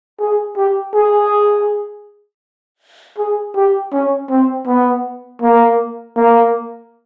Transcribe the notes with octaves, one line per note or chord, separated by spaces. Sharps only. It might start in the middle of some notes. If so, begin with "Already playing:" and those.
G#4
G4
G#4
G#4
G4
C#4
C4
B3
A#3
A#3